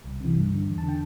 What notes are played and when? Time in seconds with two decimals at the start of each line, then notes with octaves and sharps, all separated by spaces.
0.04 C2
0.21 C3 E3
0.36 G2
0.51 D3
0.67 E2
0.78 A5
0.83 D3
0.89 G5